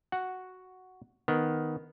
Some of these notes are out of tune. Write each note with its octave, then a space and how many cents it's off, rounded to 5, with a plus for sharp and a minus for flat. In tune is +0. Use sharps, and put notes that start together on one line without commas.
F#4 +0 F#5 +0
D#3 +0 B3 +0